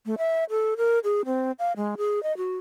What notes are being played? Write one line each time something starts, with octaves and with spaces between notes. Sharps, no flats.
A3
E5
A4
A#4
G#4
C4
F5
G#3
G#4
D#5
F#4